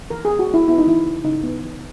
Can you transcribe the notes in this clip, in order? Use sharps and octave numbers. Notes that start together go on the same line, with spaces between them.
E3 A#4
B3 G#4
F#4
G#3 E4
B3 E4
D#4
E3 E4
C#3
C#3 D#4
B3
E3